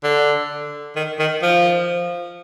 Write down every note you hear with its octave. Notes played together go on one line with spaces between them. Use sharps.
D3
D#3
D#3
F3